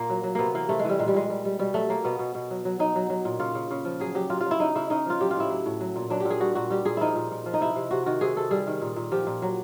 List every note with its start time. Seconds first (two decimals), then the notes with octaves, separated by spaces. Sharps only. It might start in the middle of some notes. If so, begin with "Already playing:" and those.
Already playing: A#2 A#3
0.10 F#3
0.24 F#3
0.35 C3 A#3 B3
0.54 E3 A#3
0.69 C3 A3
0.79 E3 G#3
0.89 G3
0.99 A#2 G#3
1.08 G3
1.14 A#2 G#3
1.30 G3
1.45 G3
1.59 B2 G3
1.74 F#3 A3
1.89 F#3 A#3
2.04 B2 B3
2.19 B2
2.35 B2
2.50 F#3
2.65 F#3
2.79 F#3 D#4
2.96 F#3
3.10 F#3
3.25 A#2
3.40 C#3 F4
3.55 C#3
3.71 C#3
3.85 F3
4.00 F#3 G#4
4.15 F#3 G4
4.30 F#3 F4
4.40 F4
4.46 F#3
4.51 E4
4.60 C#3 D#4
4.75 C#3 E4
4.90 C#3 D#4
5.06 F3 F4
5.20 F#3 G4
5.31 F4
5.36 A2 E4
5.50 F#3
5.66 A2
5.81 F#3
5.96 A#2
6.10 F#3 D4
6.20 G4
6.25 A#2
6.30 G#4
6.40 G3 F#4
6.55 A#2 F#4
6.70 G3 G4
6.85 A#2 G#4
6.97 F3 D#4 E4
7.15 A#2
7.32 A#2
7.46 F3
7.54 D#4
7.61 C3 E4
7.76 C3
7.91 C3 F#4
8.06 D#3 F#4
8.21 C3 G#4
8.36 C3 A4
8.51 G3 G#4
8.67 D#3
8.82 A#2
8.96 A#2
9.12 F3 G4
9.27 A#2
9.42 F#3